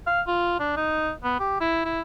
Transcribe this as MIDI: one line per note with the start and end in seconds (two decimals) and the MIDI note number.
0.07 0.21 77
0.27 0.58 65
0.60 0.72 62
0.77 1.11 63
1.24 1.37 59
1.40 1.60 67
1.61 1.80 64
1.85 2.01 64